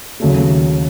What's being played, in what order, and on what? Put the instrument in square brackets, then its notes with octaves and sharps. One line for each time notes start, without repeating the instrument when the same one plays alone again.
[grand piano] D#2 C#3 F#3 A3